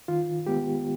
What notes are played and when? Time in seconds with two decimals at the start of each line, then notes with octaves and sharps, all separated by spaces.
0.08 D#3 F4
0.46 G#3 B3 G4